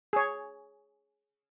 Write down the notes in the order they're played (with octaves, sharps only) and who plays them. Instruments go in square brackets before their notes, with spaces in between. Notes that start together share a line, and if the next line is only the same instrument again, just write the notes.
[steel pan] G#4 C#5